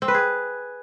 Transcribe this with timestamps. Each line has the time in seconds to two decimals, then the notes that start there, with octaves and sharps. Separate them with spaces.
0.02 C4
0.08 B4
0.14 G#4